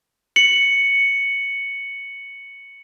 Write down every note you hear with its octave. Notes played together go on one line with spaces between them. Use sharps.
C#7 F#7